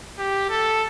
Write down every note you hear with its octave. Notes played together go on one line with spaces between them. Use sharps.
G4
A4